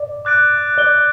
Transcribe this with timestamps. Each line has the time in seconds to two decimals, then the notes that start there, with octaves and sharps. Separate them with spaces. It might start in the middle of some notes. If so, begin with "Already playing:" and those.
Already playing: D5
0.25 D6 F#6 A6 D7
0.78 D5 D6 G6 D7 G7